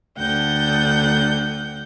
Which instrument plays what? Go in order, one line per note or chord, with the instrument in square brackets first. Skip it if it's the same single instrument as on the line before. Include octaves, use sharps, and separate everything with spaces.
[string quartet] D2 D3 F#5 G5 G6